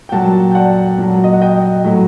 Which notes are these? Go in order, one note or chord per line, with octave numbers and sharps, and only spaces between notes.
G5
A#2 F#3 F#5 A5
G5
D5 F#5
A#2 F#3
D#5
F#5
D#5 G5
A2 F#3